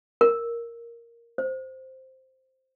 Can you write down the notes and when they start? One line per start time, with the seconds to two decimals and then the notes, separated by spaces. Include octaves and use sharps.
0.21 A#4
1.38 C5